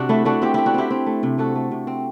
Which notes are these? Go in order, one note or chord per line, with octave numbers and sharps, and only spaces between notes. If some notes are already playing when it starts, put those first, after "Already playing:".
Already playing: C3 D4 F#4
A3 E4
A3 D4 F#4
C4 E4 G4
C4 E4 G4
D4 F#4
C4 E4 G4
C4
A3
C3
A3 F#4 A4
A3
C3
C4